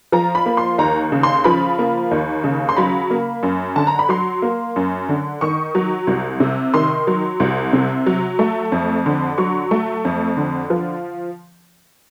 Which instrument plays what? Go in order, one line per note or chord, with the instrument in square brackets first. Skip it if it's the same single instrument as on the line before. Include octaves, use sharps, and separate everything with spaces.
[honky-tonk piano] F3 A#5
B5
A#3
C6
D#2 A#5
C#3
C6
F3 B5
A#3
D#2
C#3
C6
F#3 B5
A#3
F#2
D3 A5
A#5
B5
F#3 C6
A#3
F#2
D3
D#3 C#6
F#3
C2
C3
D#3 C6
F#3
C2
C3
F#3
A3
F2
D3
F#3 C#6
A3
F2
D3
F3